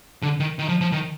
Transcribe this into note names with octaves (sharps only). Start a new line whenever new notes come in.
D3
D#3
D#3
F3
F3
D#3